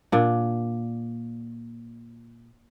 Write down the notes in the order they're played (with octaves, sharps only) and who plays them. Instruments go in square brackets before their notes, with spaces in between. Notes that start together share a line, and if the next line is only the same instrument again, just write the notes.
[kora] A#2 D4